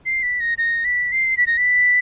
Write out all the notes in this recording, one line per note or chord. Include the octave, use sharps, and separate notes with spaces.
C7
B6
A#6
A#6
B6
C7
B6
A#6
B6